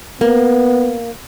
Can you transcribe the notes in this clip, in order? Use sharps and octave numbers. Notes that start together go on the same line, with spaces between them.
A#3 B3